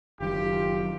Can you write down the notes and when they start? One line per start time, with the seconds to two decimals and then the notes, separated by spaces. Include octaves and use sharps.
0.20 F#1 D#3 F#3 F4 G4